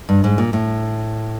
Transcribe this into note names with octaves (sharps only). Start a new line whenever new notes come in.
G2
G#2
A#2
A2